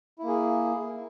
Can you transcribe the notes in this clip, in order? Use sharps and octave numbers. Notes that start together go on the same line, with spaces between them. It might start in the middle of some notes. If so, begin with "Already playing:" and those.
A#3 E4 G#4